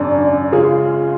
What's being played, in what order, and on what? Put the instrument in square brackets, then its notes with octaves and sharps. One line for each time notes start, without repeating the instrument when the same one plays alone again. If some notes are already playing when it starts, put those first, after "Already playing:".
Already playing: [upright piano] G#1 F#2 C#3 [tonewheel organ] D4
[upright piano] C#3 G#3 C#4 G#4 [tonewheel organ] F4